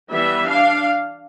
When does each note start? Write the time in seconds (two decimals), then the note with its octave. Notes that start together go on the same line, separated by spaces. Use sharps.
0.10 E3 G3 B3 E5
0.47 D4 F5